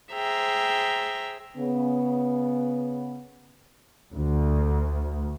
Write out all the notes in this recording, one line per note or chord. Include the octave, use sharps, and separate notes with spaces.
G#4 C5 E5 G5 A#5
C#3 B3
D2